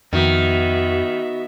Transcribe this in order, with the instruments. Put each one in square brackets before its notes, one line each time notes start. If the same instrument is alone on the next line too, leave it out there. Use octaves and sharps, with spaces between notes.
[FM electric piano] F2 [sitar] D#3 [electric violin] B3 E5 [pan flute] F#4